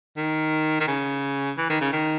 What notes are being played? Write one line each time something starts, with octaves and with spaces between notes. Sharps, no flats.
D#3
D#3
C#3
E3
D#3
C#3
D#3